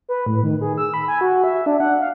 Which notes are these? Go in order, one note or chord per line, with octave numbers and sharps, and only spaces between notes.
B4
A2
D#3
G#4
E6
B5
G#5
F#4
E5
D4
F#5
F5